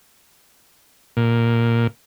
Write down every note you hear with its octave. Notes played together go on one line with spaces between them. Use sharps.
A#2